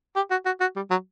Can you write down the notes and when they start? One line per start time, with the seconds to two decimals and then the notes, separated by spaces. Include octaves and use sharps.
0.16 G4
0.31 F#4
0.46 F#4
0.61 F#4
0.76 G3
0.90 F#3